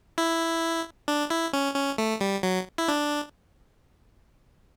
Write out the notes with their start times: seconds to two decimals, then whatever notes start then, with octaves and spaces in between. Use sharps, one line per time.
0.18 E4
1.08 D4
1.30 E4
1.53 C#4
1.75 C#4
1.98 A3
2.21 G3
2.43 F#3
2.78 E4
2.88 D4